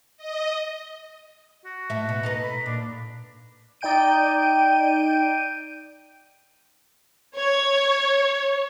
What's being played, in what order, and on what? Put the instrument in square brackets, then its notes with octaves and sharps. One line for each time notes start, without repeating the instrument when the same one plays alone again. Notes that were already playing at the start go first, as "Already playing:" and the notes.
[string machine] D#5
[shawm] F#4
[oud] A2 E5
B2
[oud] D#4 A4 B4 [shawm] A#5
[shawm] B5
[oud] A#2 [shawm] D4
[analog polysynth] D#4 D5 G5 G6 D7 D#7
[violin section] C#5